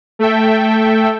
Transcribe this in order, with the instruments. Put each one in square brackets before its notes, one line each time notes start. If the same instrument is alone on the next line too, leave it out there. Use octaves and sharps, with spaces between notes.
[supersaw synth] A3 A4 E5 G5